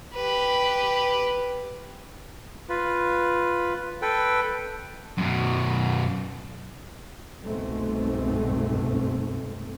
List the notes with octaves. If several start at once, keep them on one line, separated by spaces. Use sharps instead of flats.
G4 B4
F4 B4
A4 B4 G5
F#2 B2
F#1 C2 G#2 B2 A3 C4